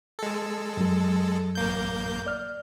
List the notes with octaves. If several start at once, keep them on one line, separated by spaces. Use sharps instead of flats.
G#3 A4
F#2 F#3
A1 A#3 G6
D5 F6